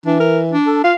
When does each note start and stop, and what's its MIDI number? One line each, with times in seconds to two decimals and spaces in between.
0.06 0.55 52
0.06 0.19 62
0.20 0.40 70
0.52 0.79 62
0.66 0.80 69
0.84 0.93 65
0.84 0.96 77